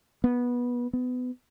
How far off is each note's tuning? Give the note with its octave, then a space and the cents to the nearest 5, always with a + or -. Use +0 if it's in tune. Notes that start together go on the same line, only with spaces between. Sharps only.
B3 -15
B3 +25